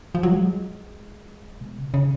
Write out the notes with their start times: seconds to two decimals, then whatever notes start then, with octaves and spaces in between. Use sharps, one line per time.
0.15 F3
0.23 F#3
0.32 G#3
1.61 B2
1.78 C#3
1.94 C#3